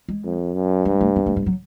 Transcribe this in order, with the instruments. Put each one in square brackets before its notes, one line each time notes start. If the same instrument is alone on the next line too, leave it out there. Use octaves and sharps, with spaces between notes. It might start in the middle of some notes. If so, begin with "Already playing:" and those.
[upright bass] G#3
[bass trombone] F2
F#2
[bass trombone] G2 [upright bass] G#3
[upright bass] A3
B3
A3
G#3
F#3